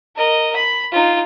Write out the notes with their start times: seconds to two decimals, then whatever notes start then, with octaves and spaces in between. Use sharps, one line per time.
0.16 A#4 D#5
0.56 B5
0.92 D#4 F4